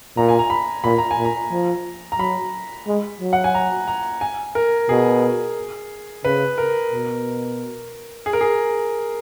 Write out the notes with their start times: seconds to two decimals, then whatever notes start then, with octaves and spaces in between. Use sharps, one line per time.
0.17 A#2 A#5
0.29 G#5
0.39 A#5
0.50 B5
0.84 A#2 B5
0.98 A#5
1.11 G#5
1.18 A#2
1.25 A#5
1.52 F3
2.12 A#5
2.19 F#3 B5
2.87 G#3
3.21 F#3
3.33 F#5
3.44 G#5
3.54 A#5
3.88 A#5
4.21 G#5
4.55 A#4
4.89 B2 G#4
6.25 C#3 B4
6.58 A#4
6.92 B2
8.26 G#4
8.33 A#4
8.41 G#4